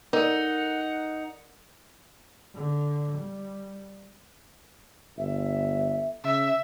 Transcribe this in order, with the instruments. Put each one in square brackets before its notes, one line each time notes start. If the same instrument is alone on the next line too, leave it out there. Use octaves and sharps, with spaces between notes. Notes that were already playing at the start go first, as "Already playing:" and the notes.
[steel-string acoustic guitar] D#4 [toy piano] A4 A#4 [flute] F#5
[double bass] D3
G3
[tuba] G1 [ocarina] E5
[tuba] C#3 [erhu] E5